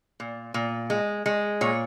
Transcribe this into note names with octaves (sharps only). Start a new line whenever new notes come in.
A#2
A#2
G#3
G#3
A#2 C#5